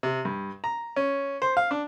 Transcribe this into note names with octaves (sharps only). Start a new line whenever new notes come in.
C3
G2
A#5
C#4
C5
F5
D4